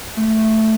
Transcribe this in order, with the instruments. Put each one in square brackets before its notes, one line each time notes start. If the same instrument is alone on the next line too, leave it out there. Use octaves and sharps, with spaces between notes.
[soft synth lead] A3